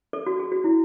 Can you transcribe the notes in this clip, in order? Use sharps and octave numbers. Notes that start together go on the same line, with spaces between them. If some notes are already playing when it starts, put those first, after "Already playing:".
A4
F#4
G#4
F#4
E4